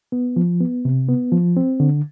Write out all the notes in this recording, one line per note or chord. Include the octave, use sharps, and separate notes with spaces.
B3
F3
B3
C3
B3
F3
C4
D3